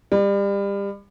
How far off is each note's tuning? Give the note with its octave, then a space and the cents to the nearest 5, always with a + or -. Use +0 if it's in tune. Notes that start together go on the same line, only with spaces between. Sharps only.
G3 +30